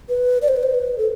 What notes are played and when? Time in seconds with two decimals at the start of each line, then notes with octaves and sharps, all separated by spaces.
0.09 B4
0.42 D5
0.48 C5
0.57 B4
0.63 C5
0.74 B4
0.98 A4